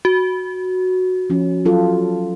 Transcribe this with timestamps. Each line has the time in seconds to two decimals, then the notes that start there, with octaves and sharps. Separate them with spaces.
0.05 F#4
1.30 F3 C#4
1.65 F#3 F4 A4